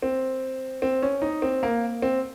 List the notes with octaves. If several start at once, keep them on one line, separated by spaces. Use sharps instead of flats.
C4
C4
C#4
D#4
C4
A#3
C4